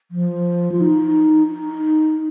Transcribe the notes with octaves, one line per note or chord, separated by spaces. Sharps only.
F3
F4
D#4
D#4